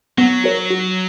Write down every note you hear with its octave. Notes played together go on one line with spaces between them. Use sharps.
F#3 B3
F#4 A#4 C#5
F#4